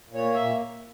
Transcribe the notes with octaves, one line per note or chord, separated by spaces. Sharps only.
A#2
C#5
A#3
A#2 E5